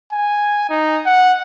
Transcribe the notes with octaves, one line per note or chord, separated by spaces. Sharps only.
G#5
D#4
F#5